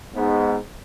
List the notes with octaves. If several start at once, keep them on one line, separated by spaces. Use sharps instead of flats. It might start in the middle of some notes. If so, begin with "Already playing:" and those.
G#2 B3